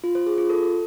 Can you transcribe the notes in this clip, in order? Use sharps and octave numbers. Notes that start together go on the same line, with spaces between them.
F4
C5
G#4
F4
A4